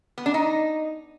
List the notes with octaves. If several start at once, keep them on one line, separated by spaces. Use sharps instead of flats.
B3
D4
D#4